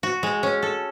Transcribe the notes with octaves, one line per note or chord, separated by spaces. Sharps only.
F#4
G#3
C#4
A4